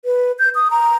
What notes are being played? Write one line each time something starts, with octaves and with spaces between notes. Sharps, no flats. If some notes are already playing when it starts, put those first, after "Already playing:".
B4
G6
D#6
A#5